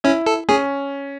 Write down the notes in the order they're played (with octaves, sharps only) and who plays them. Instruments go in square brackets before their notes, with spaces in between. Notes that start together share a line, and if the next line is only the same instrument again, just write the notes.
[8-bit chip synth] C#4 [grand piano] E4
[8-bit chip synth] A4
[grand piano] C#4 [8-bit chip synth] G#4